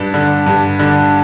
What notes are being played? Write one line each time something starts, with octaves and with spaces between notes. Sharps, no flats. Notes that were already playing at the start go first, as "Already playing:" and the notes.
Already playing: G2 A5
D3
G2
D3